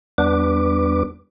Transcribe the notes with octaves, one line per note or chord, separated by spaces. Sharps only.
E2 G3 B3 D4 B4 D6